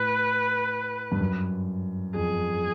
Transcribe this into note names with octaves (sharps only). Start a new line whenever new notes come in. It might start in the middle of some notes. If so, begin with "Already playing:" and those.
Already playing: A2 B4
G2
F#2
F2 G#4